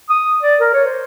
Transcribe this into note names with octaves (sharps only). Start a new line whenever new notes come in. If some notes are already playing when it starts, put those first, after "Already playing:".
D#6
D5
A#4
C#5
C5